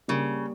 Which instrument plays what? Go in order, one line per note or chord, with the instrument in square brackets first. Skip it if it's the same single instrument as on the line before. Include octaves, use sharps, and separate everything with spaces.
[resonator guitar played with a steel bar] C#3 [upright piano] G3 A#3